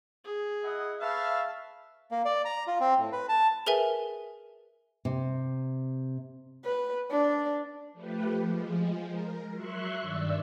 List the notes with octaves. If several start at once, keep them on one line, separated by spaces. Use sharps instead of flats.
G#4
E4 D#5 F#5
B4 C#5 E5 F5 A5
A#3
D5
A#5
F4
C4
A2
B4
A5
G#4 A#4 B4 E5 G#5
C3
B4
D4
F3 A3 G4 B4
F3 G#3
A#4
F#3 E5 C6 C#6 F#6
G2 D#3 D5 E6